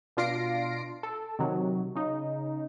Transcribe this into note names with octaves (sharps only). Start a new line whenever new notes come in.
B2 D4 F4 A#6 C7 D7
A4
C3 D#3 F#3
C#3 D#4